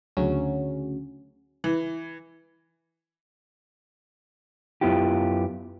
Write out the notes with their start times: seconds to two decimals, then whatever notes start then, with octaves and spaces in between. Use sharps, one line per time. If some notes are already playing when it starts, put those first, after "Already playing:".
0.17 D2 C#3 F#3 C#4
1.64 E3
4.81 F#2 B3 E4 F4 G4